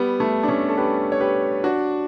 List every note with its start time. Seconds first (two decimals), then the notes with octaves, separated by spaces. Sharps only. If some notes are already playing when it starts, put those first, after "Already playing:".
Already playing: G3 B3
0.20 A3
0.43 D4
0.48 A3 C#4
0.69 A4
0.77 G4 B4
1.12 C#5
1.20 G4 B4
1.64 D4 F#4